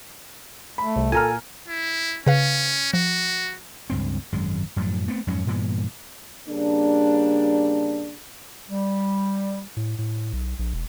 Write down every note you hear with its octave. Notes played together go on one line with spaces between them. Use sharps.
A3 B5
C2
A#2 A4 G#5 A#5 F6
E4
C#3 C#4 B4 F5
F3 F#4
C#2 G2 C4
G#1 F#2 G#3
F#2 A2 F3 F#3
A3 B3 C4
F2 G#2 F#3 C#4
G2 A#2 E3 B3
C#3 G3 A#3 D4
G3
A2
A2
B1
A#1
E1